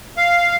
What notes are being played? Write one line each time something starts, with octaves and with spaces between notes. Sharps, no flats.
F5